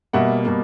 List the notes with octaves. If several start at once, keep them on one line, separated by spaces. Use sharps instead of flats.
B2 G3 A#3 E5 F#5
B2 G3 A#3